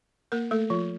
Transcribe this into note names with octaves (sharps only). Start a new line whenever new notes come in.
A#3 A#4
A3 A4
F3 F4